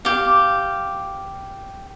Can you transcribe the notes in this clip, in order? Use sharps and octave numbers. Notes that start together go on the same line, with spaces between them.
G4 F5